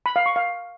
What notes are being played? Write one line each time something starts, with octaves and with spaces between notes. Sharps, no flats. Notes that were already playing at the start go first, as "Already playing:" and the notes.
B5
F5
C#6
F5